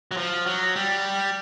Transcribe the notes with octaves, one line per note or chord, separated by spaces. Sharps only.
F#3
F3
F#3
G3